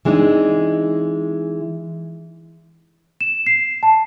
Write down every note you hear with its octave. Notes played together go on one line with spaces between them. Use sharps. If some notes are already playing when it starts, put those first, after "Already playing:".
E3 G#3 C4 D4 D#4
E7
C7
A5